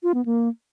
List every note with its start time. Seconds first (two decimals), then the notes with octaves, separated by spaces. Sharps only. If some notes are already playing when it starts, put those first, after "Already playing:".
0.03 F4
0.14 B3
0.25 A#3